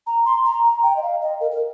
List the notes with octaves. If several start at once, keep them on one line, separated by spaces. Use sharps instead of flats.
A#5
C6
A#5
A#5
G5
D#5
F5
D#5
A#4
A#4